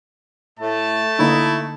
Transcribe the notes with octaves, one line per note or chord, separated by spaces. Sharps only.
A2 A3 A5
D3 A#3 D#4 E4